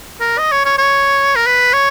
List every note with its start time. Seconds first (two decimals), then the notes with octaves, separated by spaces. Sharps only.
0.20 A#4
0.38 D#5
0.52 C#5
0.65 C#5
0.78 C#5
1.36 A#4
1.46 B4
1.73 C#5